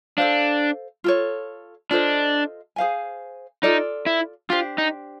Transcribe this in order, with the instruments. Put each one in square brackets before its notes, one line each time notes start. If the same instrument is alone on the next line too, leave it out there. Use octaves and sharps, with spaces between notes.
[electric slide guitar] D4 [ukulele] A4 C5 F5
[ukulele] F4 A4 C#5
[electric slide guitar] D4 [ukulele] F4 A4 C5 D#5
[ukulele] G#4 C5 F5 G#5
[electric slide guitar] D#4 [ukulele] F4 A4 D5
[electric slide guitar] E4
[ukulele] D4 G4 C5 [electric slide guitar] F4
[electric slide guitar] D#4